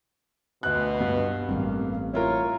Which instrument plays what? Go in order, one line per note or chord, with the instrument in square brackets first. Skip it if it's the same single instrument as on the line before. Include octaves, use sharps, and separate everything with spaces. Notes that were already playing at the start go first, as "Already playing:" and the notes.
[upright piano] D2 F#6 [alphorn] B2
[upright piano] G2 [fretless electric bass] B3
[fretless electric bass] A1 G3 C4 [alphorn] A#3
[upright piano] E4 F4 A#4 [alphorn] C#5